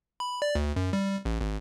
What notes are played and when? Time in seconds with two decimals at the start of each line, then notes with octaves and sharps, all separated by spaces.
0.20 B5
0.42 D5
0.55 D2
0.76 F#2
0.93 G3
1.25 A1
1.41 G#1